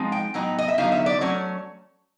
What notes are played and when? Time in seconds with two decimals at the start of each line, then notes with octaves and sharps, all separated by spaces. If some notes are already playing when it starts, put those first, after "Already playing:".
Already playing: F3 G#3 C4 D#4
0.12 G5
0.34 A2 F#3 B3 D#4
0.59 D#5
0.68 E5
0.78 D3 F#3 B3 D#4 F5
0.92 E5
1.06 D5
1.21 F#3 A3 C#4 C#5